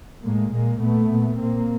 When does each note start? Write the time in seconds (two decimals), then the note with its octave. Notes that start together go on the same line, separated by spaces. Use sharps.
0.25 A2 G#3 A#3
0.53 A#2 G#3 A#3
0.81 A#2 A3 B3
1.10 A#2
1.38 A#2 A#3 C4